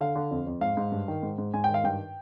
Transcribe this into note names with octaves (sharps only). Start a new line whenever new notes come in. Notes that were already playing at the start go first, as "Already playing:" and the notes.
D3 F5
D3
F2
F2
G#2 F5
G#2
G2
D#3
G#2
G#2
G#2 G#5
D#3 G5
F5
G2 G5